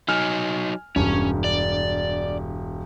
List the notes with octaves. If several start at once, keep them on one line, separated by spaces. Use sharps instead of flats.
F#3 D#4 G#5 F6
E1 G2 C#4
D5